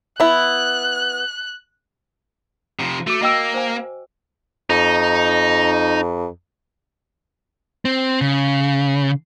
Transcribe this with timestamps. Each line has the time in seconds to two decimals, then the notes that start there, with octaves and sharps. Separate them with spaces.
0.20 B3 E4 F#6
2.80 C3 F3
3.07 A3 F#4 D6
3.22 A#3 D#5 G5 E6
3.54 C5 G#5
4.70 F2 D#4
7.85 C4
8.21 C#3